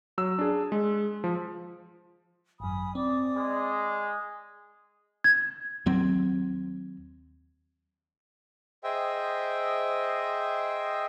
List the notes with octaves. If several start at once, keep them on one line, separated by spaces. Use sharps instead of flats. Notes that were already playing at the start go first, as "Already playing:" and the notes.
F#3 E6
D4 G#4
G#3
F3
G#1 F#2 G#5 B5 D#6
C4 D5 D6 D#6
G#3
G#6
D#2 F#3 C4
G#4 C5 D#5 E5 G5